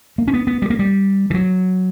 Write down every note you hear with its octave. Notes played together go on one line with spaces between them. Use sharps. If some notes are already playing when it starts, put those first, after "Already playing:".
A#3
C#4
B3
B3
G3
A#3
G3
E3
F#3